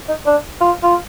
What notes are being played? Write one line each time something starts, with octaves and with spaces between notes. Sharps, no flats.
D#4
D4
F4
F4